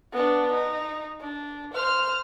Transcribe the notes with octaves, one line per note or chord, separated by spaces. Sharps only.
B3 D4
D#4
D4
C5 F6